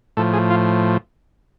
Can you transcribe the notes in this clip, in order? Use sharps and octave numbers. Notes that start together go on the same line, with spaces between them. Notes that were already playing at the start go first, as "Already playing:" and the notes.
A2 F3 A4
G#4
F4